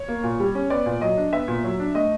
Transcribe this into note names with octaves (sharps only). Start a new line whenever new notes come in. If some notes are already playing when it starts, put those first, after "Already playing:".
Already playing: C#5
A#3
A#2
G3
C#4
B3 D5
A#2
F#3 D#5
D4
B3 E5
A#2
F#3
D4
A3 D#5